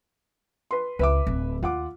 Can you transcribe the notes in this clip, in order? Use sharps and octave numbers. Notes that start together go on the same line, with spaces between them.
B4 C6
C#2 B4 E5 D6
D1 D3
D#2 F4 F#5 D6